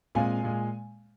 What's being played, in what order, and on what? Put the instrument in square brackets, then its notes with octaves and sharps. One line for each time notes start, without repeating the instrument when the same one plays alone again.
[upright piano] A#2 G#3 C4 F5 G#5
A#2 G#3